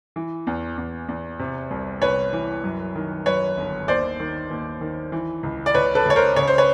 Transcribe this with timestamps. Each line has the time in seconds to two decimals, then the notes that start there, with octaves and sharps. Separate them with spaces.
0.16 E3
0.47 E2
0.77 E2
1.08 E2
1.39 C3
1.71 C2
2.02 C2 B4 C#5
2.33 E3
2.64 F#2
2.95 D#3
3.26 F#2 B4 C#5
3.57 G1
3.88 D#2 C5 D5
4.20 D#3
4.51 D#2
4.81 D#3
5.12 E3
5.43 C#2
5.66 D5
5.74 C#2 B4 C#5
5.95 A4 B4
6.06 C#2 C#5
6.16 A#4 C5
6.36 C#3 C#5
6.47 C5
6.58 B4 C#5